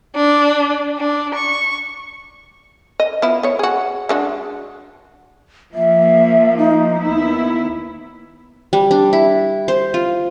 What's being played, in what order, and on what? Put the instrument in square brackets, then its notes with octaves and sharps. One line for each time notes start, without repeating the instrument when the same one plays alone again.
[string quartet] D4
D4
C#6
[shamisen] D#5
B3 E4 F4
B3 C#5
F#4 G#4
G#3 D4 F#4
[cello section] F3 A#3 [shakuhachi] E5
[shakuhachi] D#4
[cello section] D#2 B3 E4
[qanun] G3
D4
E4
C5
F4